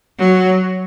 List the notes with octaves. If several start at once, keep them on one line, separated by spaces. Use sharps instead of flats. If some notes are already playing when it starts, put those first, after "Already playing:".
F#3